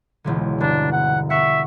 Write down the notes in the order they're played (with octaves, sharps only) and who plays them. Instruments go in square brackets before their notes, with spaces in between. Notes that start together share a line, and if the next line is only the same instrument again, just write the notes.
[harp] E1 C#2 D3
[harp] G1 G2 [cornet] D4
[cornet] F#5
[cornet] E5 [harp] F#5 C#6